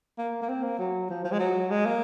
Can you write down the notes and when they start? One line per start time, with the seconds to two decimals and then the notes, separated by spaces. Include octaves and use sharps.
0.18 A#3
0.42 A#3
0.49 C4
0.63 A#3
0.79 F#3
1.10 F3
1.24 F3
1.32 G#3
1.39 F#3
1.70 G#3
1.85 A#3